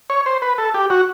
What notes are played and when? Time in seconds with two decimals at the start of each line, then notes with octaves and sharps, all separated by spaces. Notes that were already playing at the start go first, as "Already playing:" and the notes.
0.10 C#5
0.26 C5
0.42 B4
0.58 A4
0.74 G4
0.90 F#4